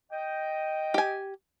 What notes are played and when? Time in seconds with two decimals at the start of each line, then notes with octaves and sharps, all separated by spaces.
0.12 D#5 G5
0.94 G4 G#5